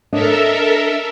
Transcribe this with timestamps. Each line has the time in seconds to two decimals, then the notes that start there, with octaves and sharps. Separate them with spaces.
0.13 D4 A4 A#4 C#5 D#5 E5